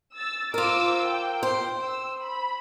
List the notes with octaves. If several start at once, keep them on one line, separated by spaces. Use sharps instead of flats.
E6 A6
F4 A#4 C5 D6 E6
G5
C5
E6
B5